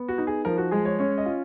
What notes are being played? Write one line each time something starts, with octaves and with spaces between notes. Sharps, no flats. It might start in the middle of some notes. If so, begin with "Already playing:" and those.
Already playing: B3
F#4
D#4
G#4
F3 A#4
F#4
G#3 G#4
C#5
C#4 C#5
D#5
F4